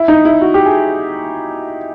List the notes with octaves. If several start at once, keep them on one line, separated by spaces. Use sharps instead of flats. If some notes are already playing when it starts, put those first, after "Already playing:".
Already playing: E4
D#4
E4
F#4
G4
G#4